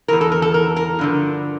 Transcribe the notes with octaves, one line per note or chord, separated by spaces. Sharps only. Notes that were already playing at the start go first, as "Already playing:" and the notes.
E2 E3 A#4
A4
A#4
A4
A#4
A#4
G2 D3 F3